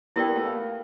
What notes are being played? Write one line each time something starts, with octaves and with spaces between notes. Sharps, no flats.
B3 E4 G4 A#4 D5 G5
A3
A#3